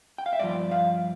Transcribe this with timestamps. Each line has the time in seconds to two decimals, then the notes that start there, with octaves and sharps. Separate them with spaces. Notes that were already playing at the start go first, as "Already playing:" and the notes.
0.18 G5
0.26 F5
0.33 E5
0.39 G2 F3 D5
0.71 F5